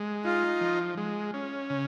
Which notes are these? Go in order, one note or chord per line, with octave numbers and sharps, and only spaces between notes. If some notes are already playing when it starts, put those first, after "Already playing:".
Already playing: G#3
D#4 F4
F3
G#3
C#4
C#3